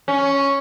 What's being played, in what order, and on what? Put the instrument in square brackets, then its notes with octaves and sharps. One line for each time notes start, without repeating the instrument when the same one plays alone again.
[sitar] C#4